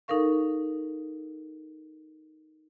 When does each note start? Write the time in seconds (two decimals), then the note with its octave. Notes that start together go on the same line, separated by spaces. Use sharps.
0.08 D#4 A4 A#4 F5 C#6